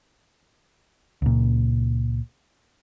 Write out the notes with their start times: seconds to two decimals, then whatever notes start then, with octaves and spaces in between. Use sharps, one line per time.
1.22 C#2 A#2